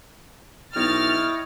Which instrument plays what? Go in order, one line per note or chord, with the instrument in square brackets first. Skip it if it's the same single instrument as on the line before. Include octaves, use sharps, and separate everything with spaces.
[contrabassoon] B1 [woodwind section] E4 [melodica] C#5 D#5 G5 [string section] F6 A6